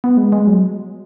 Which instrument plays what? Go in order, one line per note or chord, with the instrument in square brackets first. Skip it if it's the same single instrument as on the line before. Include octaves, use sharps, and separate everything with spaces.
[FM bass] B3
G#3
G#3
F#3